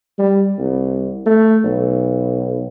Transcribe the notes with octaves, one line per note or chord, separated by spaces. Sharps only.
G3
C2
A3
B1